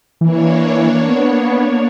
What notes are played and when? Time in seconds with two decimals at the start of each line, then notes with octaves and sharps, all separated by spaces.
0.21 E3 A#3 D4 C#5
1.09 B3